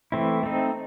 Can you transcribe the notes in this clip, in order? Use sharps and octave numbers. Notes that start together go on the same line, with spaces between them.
E3 A3 C4 E4
A3 C4 D#4